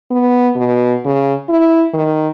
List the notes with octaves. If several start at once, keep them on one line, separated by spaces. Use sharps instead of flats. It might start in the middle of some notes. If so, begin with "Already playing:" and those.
B3
B2
C#3
E4
D#3